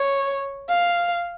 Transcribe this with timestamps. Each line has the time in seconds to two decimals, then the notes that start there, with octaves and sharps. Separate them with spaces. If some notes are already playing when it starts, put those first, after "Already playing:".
Already playing: C#5
0.69 F5